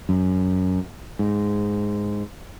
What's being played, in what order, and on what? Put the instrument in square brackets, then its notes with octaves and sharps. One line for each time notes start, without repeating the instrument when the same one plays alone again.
[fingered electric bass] F#2
G#2